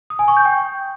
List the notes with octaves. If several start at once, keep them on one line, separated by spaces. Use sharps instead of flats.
D#6
G#5
C#6
G6
G5